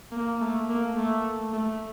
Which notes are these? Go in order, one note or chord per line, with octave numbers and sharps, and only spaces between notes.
A#3
A3
A#3
A3
A3